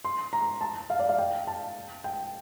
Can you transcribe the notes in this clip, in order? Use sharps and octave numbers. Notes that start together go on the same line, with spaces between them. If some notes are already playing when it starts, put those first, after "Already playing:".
C6
A#5
A5
F5
D5
F5
G5
A5
G5